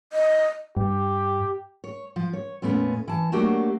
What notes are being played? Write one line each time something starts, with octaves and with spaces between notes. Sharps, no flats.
D#5
G2 G4
C#5
F3
C#5
F2 A#2 A3 B3 C#4
E3 A5
F#3 A3 A#3 D4 F#4 G4